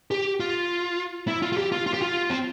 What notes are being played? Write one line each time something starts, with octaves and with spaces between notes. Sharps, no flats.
G4
F4
E4
F4
F4
G4
F4
F4
G4
F4
C4